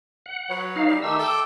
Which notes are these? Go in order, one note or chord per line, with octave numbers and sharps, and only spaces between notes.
F#5
F#3 B4 C#5
D#4 F5
G3
D#3 A3 D#4 G4 E6
A4 G5 A5 D6